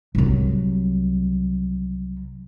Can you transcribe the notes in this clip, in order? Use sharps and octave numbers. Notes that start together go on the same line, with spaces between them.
C2 F#3